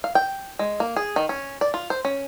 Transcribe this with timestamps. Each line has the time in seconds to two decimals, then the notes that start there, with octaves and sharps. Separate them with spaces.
0.04 F5
0.15 G5
0.59 G#3
0.80 A#3
0.96 G#4
1.16 D#3
1.29 C#4
1.61 D5
1.74 F4
1.90 C5
2.05 C#4